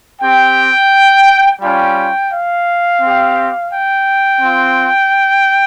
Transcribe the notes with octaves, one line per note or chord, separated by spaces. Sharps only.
C4 G4 G5
G3 C#4 F4 G5
F5
C4 G4
G5
C4 F4